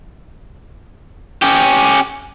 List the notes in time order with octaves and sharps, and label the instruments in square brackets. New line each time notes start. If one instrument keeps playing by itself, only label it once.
[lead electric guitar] C#4 G4